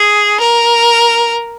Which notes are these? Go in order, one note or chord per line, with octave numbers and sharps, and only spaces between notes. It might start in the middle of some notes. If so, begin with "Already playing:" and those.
Already playing: G#4
A#4